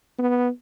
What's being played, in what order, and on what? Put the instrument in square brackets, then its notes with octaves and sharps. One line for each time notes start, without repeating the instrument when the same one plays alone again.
[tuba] B3